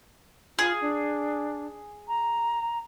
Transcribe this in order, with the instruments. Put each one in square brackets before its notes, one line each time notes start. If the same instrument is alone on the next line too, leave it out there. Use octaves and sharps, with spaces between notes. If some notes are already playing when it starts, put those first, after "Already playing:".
[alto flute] F4 [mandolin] G#4
[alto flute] D4
A#5